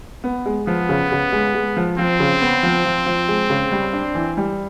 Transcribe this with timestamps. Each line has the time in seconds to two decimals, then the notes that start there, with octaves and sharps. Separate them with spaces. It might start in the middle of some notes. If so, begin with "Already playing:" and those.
0.24 B3
0.46 G#3
0.67 F3 B3
0.89 C#3
1.12 C#3
1.32 G#3
1.55 G#3
1.77 F3
1.98 F3 C4
2.20 C#3
2.41 B3
2.63 F3
2.85 F3
3.06 F3
3.28 G#3
3.50 C#3
3.72 G3
3.93 D4
4.15 E3
4.37 G3